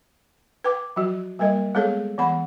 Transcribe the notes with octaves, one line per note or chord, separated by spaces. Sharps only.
B4 G5 D6
F3 F#3 F#4
G3 A#3 A#4 D#5
G#3 B3 G#4 A4 C#5
E3 B3 F#5 B5